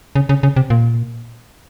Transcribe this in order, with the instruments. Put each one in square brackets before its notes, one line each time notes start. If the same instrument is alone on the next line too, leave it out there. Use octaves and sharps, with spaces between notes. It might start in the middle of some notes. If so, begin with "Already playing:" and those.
[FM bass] C#3
C#3
C#3
C3
A#2